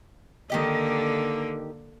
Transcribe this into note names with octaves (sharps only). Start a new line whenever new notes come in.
D3 D#3 A#3 G4 D#5